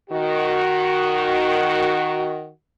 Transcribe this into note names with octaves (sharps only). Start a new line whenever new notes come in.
D#3 F#4